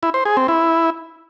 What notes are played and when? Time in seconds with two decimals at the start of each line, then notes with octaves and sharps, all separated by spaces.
0.03 E4
0.14 C5
0.25 G#4
0.37 C4
0.48 E4